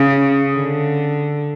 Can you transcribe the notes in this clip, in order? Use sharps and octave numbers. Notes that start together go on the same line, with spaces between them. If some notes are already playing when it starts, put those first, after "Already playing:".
Already playing: C#3
D3